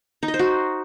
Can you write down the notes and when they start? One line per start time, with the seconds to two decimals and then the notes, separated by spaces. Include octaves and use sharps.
0.23 D#4
0.28 D#5
0.34 C5
0.39 F#4